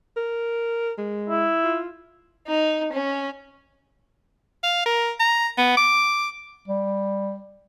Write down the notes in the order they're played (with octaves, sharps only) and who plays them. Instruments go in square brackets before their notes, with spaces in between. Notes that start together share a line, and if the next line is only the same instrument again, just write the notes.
[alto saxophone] A#4
G#3
[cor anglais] E4
[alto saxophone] F4
[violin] D#4
C#4
[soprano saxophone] F5
A#4
A#5
B3
D6
[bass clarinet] G3